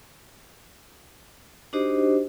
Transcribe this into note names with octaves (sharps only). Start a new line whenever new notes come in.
D4 D#4 F#4 G4 C5 D#5